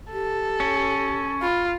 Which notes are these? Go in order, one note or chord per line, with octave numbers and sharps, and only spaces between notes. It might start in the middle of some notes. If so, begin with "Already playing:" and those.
G4 A4
C#4
F4 B5